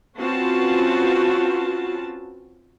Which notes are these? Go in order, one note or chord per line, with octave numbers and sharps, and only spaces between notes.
C4 C#4 F4 F#4 B4 A5